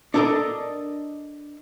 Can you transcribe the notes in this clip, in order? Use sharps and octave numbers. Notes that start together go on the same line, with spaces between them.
D4 A4 A#4 D5 D#5